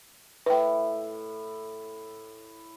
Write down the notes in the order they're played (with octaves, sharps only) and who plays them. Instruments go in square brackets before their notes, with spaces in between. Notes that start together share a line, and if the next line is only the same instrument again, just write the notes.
[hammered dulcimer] A2 E4 [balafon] B4 G5